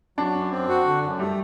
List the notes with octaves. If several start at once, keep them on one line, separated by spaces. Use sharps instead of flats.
F#3 D4
F#2
C4
F#4
D3
F#2
G3 A3